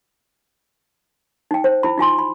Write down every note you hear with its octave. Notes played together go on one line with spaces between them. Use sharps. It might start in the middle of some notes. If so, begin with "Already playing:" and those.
D#4 G5
C5
E4 B5
D#4 F4 G#5 C6
B5